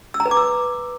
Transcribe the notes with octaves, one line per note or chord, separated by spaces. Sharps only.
E6
A#5
B4
D6
E6